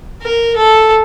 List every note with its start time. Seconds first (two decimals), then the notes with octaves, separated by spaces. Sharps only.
0.23 A#4
0.56 A4